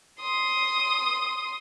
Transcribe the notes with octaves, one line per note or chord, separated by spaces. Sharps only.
C6 D#6